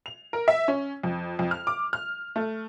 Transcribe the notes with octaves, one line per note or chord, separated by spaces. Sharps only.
F7
A#4
E5
C#4
F2
F2
F6
D6
F6
A3